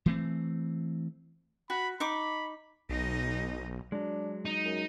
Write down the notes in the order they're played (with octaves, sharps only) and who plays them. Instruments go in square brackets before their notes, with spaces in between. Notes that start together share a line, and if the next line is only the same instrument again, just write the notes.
[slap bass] E3 A3 C4
[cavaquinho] F#4 [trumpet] B5
[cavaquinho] D#4 C#6 D6 [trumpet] B5
[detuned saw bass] B1 [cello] D#4 D#5
[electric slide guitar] F#3 G#3 [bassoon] D4
[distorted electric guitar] D#4
[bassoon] F#2